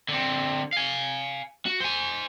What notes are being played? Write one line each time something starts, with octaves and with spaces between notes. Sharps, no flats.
D3 C4
F5 G#5
F#4
C5 G#5